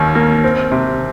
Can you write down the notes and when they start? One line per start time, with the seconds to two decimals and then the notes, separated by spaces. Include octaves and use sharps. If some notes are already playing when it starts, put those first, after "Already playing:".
Already playing: D#2 D#3 C#4
0.15 A#3
0.44 C4
0.72 C3